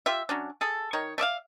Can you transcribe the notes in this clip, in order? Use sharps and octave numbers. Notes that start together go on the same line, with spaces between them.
F4 G4 E5
F#3 C#4 D4
G#4 A4
D#3 D#4 C#5
A3 D5 E5 F5